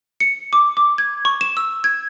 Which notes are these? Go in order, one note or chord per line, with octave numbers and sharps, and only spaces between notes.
C#7
D6
D6
G#6
C#6
E7
E6
G#6